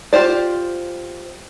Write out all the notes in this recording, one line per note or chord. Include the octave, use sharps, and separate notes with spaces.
F4 G4 C5 D5